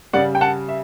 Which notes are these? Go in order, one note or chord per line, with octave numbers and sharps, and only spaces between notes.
C#3 G3 D5 F#5
G5
F#5 A5
E5